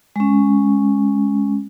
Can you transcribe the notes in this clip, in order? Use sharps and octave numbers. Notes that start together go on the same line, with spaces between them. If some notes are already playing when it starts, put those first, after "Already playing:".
G#3 C#4